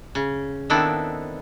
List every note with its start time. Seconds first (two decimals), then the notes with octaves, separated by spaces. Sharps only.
0.15 C#3
0.70 D#3 B3 C4 D4 E4 A4